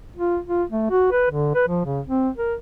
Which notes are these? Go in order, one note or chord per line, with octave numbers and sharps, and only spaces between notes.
F4
F4
A3
F#4
B4
D3
B4
F3
C#3
C4
A#4